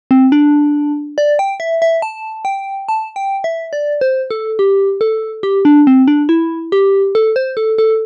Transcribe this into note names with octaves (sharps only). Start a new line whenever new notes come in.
C4
D4
D5
G5
E5
E5
A5
G5
A5
G5
E5
D5
C5
A4
G4
A4
G4
D4
C4
D4
E4
G4
A4
C5
A4
A4